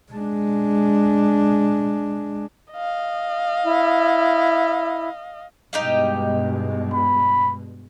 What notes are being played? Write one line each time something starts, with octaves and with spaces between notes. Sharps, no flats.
G#3 D4
D#5 F5
E4
G2 B2 G#3 D#4 G4 F5
B5